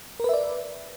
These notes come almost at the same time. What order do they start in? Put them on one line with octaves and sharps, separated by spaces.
A#4 B4 E5 D5